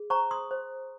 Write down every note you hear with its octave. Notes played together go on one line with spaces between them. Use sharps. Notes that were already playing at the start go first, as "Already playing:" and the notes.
Already playing: G#4
C5 A#5 C#6
C6 D#6
C5